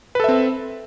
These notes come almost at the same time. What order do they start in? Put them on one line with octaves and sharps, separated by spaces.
B4 A4 E5 C4